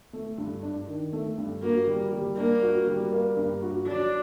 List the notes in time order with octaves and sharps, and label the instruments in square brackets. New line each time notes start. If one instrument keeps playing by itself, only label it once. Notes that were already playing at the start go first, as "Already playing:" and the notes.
[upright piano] A3
G2
D4
D#3
A3
G2
[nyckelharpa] A#3 [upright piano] F#4
[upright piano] G3
G3
[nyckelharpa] A#3 [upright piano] D4
[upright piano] F#4
G3
A#3
G2
F#4
[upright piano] F#3 [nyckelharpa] D4